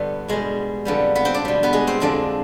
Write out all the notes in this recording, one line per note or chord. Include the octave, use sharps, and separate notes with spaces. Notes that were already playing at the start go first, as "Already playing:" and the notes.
Already playing: G2 D3 G3 B3 B4
B2 G3 G#3 G#4
F2 D3 G3 B3 B4
B3 B4
C4 C5
D4 D5
B2 G3
B3 B4
G#3 G#4
C4 C5
F2 D3 G#3 D4 D5